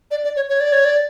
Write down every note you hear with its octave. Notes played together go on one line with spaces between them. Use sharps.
D5
D5
C#5
C#5
D5
C#5
D5